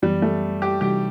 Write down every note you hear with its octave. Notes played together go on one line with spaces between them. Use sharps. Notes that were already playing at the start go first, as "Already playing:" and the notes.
F#2 E3 G3 B3
A3
G4
C3 E3 G3 D#4 F#4 G4